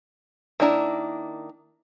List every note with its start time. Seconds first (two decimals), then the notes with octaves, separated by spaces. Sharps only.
0.60 D#3 A#3 D4 E4 A#5